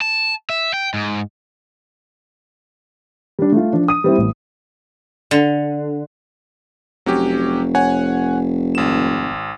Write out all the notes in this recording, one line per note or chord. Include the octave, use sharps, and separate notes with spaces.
A5
E5
G5
G#2
G3 D4
A3 F4
F3 D4
D#6 D#7
G3 C4 E4
A1
D3
F1 F#3 C#4 G4
C#5 F#5 G#5
G#1 E7